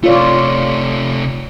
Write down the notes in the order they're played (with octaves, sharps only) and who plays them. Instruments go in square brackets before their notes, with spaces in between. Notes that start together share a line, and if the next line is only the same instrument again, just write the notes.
[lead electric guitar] C3 A3 [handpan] F4 C#5 D5